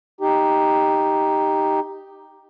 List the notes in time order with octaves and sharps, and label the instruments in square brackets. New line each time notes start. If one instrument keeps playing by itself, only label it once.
[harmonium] D#4 G4